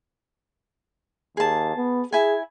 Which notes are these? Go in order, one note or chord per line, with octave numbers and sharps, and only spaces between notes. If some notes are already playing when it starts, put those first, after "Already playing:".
D#2 G#4 A5
B3
E4 G#4 G#5